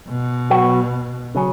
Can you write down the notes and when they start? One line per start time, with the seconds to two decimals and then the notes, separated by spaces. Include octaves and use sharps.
0.09 B2
0.50 F#3 B3 F#4
1.35 C#3 F#3 C#4